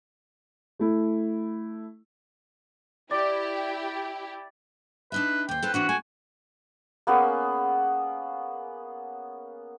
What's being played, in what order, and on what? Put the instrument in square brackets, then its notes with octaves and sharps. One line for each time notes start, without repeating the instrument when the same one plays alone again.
[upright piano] A3 E4
[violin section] E4 G4 [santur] D5
[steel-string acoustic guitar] D4 D#4 E5 [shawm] B4
[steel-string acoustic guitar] D#2 C5 [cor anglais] G5
[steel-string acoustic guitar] C4 F4 A4 [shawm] B4
[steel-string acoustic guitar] E3 C4 D4 [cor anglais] F#4
[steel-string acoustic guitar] A3 [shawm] G#5
[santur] A#3 B3 C#4 G#4